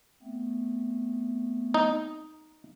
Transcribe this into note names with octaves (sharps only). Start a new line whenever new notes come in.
A3 B3 C4
D#4